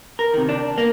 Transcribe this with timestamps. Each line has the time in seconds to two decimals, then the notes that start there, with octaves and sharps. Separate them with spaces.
0.19 A#4
0.33 C3 D#3
0.49 D4
0.78 A#3